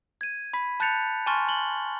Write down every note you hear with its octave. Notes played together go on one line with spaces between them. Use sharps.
G#6 D#7
B5 B6
A5 F#6 G6 A6 C#7 F7
G#5 A5 C6 C#6 F6 A6
F#7 G7